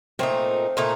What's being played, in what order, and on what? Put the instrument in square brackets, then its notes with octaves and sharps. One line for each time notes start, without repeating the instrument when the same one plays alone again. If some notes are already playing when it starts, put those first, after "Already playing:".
[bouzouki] A#2 A3 D#4 [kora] C4
[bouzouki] A#2 A3 D#4